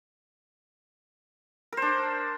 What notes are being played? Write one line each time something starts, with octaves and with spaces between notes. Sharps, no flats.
D4 A#4 C5